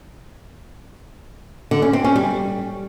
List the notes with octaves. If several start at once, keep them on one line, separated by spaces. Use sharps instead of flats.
D3
C#4
C4
C#4
G3